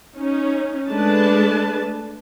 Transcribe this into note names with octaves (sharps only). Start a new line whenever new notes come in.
C#4 D#4
G#3 A3 D4 B4 A5